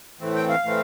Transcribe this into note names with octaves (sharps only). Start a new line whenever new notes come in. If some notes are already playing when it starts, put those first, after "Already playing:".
A2 E3 A3 C4
G5
F5
A2 E3 A3 C4